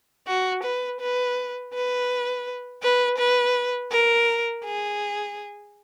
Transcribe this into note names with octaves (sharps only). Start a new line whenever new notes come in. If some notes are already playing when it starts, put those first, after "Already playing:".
F#4
B4
B4
B4
B4
B4
A#4
G#4